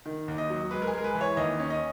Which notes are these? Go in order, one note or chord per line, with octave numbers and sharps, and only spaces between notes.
D#3
D#2
D#5
F#3
G#3 B4
A#4
G#4
G#3 A#4
B4
E3
C#5
D#2 D#5
C#4
D#5